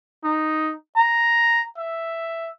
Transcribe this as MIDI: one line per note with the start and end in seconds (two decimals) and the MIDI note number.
0.24 0.73 63
0.96 1.64 82
1.78 2.49 76